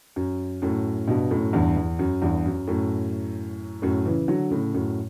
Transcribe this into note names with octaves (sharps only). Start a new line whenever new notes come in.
F#2
F#2 A2
G2 B2
F#2 A2
E2 G2
E2
F#2
E2 G2
F#2
F#2 A2
F#2 A2
C#3 E3
D3 F#3
A2 C#3
F#2 A2